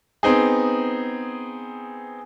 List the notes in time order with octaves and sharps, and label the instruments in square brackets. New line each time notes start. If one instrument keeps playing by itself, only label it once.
[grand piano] B3 C4 D#4 G#4